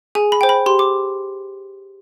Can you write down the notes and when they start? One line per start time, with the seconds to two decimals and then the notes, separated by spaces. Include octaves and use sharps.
0.15 G#4 G#5
0.32 B5
0.41 C5 G5
0.49 B5
0.66 G4 C6
0.79 D6